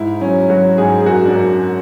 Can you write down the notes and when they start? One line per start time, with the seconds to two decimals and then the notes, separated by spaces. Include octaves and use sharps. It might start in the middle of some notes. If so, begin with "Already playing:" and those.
Already playing: G#2 E4
0.21 F#3 C#4
0.50 F#3 F#4
0.78 G#2 G#4
1.01 G#4
1.06 F#2 F#4
1.25 D4
1.35 F#2